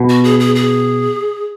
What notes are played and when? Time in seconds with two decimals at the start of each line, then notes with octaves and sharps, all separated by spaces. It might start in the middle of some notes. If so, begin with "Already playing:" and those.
Already playing: B2
0.09 F#4
0.24 G#4
0.40 G#4
0.56 G#4